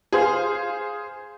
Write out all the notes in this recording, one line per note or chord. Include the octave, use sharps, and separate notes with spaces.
G#4 C5 F5